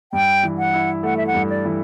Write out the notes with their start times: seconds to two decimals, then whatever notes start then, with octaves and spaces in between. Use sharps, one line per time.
0.13 G2 G5
0.43 E3
0.58 F#5
0.73 E4
1.03 A3 F#5
1.17 E5
1.27 F#5
1.34 G2
1.50 D5
1.65 E3